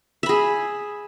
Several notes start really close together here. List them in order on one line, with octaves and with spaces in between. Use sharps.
E5 B5 G#4